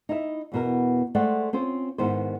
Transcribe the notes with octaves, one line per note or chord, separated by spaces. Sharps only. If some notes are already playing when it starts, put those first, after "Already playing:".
D#4 E4 E5
E2 B2 A#4
G#3 A3 C5 D5 F#5 G5
C4 C#4 F4 C5
G#2 D#3 B3 E4 B4 C5